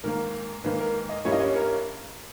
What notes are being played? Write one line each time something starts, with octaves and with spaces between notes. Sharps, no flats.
G#2 D#3 A#3 A#4
G#2 D#3 A#3 B4
A#4
D#5
G2 G3 A#3 C#4 E4 C#5
D#5
C#5
A#4